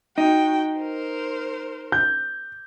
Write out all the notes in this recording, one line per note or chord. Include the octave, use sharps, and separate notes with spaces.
D#4 F#4 G5
A#4 C5
G6